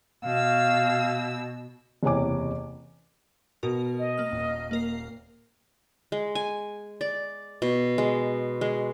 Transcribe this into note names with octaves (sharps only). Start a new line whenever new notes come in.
B2 F5 E6
F#1 E2 C3 C#5 G#5 D6
B2 A#4
D#5
A#3 F6
D#1
A#3 A#4 C7
G#3
G#5
D5
B2
G#3
G#3